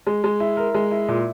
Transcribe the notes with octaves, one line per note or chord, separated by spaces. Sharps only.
G#3
G#3
E4
A#4
G#3
E4
A#2